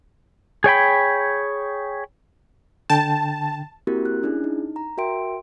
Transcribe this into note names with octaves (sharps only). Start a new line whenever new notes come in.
G#4 C#5 G5 B5
D3 G5 A5
A#3 C4 E4 F#4 G4 A#4
F#6
C#4 D4 E4 G#4
D#4
A#5
F#4 A#4 E5 G5 C6 D7